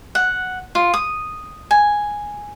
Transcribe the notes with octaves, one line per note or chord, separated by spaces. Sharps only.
F#5
F4
D#6
G#5